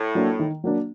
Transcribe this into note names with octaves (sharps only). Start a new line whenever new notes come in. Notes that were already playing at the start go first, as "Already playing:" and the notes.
Already playing: A2
F#3 A#3 D4
D#3
F#3 A#3 D4